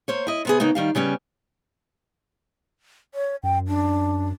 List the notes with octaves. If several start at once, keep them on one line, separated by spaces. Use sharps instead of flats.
A#3 C5 C#5
E4 D#5
C3 B3 G#4
C#3 A#3 B3 D#4
D#3 G3 F5
C#3 G3 B3 C#4
C#5
F#2 G5
D4